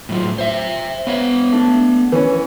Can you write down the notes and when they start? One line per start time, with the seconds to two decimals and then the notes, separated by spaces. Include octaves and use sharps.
0.09 A2 F#3 F4
0.38 C5 E5
1.07 B3 C#5 F5
1.52 A3 D4
2.12 E3 C#4